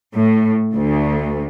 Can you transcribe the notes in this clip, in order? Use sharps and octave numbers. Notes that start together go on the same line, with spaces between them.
A2
D2